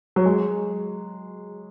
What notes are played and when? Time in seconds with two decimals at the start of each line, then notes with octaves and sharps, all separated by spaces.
0.16 F#3
0.26 G#3